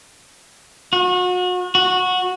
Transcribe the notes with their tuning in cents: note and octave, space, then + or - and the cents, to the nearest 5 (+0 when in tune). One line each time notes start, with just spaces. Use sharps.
F#4 -35
F#4 -15